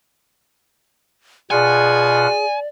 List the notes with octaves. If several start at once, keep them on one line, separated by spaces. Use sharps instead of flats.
B2 F4 G#4 D5 F#5 G#5